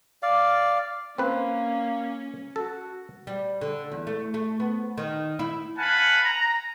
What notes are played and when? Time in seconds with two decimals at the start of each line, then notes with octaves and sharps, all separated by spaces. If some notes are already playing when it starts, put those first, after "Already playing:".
0.23 D5 F5
1.18 A#3 C4 C#4 B4
2.56 F#4 A4
3.27 G3
3.61 D3
3.91 E2
4.07 A3
4.34 A3
4.60 B3
4.98 D#3
5.39 E4
5.78 B4 F5 F#5 G#5 A5 B5
6.23 A#5